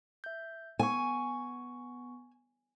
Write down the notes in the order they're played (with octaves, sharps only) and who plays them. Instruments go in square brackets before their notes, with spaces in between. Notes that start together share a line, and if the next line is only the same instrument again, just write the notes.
[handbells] E5 G6
[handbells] B3 C#6 [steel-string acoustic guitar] G#5